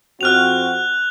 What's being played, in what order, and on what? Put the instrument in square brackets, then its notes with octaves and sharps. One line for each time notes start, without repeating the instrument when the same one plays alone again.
[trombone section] F2 C4 F#4 [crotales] F6 F#6 F7